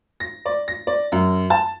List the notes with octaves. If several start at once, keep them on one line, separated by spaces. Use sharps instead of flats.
A#6
D5
A#6
D5
F#2
A5